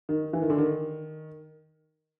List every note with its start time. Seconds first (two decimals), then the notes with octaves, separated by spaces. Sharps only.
0.09 D#3
0.33 E3
0.42 D#3
0.50 D3
0.58 D#3